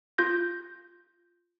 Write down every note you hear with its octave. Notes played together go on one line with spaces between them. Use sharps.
F4 G6 A#6